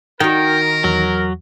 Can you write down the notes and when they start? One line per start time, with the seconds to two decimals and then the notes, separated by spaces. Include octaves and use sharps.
0.20 D#3 F#4 A#4 G5
0.84 E2 F#3